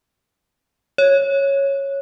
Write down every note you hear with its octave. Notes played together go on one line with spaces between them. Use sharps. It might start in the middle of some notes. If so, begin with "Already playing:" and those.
C#5